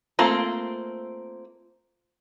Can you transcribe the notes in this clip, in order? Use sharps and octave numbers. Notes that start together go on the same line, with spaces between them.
A3 A#3 C4 F4